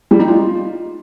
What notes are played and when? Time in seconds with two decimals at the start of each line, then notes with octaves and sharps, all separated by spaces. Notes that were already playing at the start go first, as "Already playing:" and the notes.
0.11 G3
0.19 D#4
0.28 F4